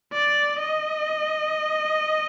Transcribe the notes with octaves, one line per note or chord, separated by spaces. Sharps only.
D5
D#5